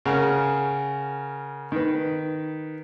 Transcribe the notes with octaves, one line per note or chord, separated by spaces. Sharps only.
C#3 A#4 F#5
D#3 B4